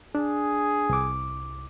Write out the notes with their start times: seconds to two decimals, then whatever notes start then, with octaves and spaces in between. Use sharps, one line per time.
0.15 D4 G#4
0.89 C2 D6